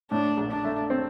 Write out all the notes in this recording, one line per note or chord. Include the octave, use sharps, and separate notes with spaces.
A2 D4
A#1
D4
A3
C4